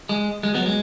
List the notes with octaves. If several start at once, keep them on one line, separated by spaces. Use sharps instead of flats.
G#3
G#3
F#3 B3
G#3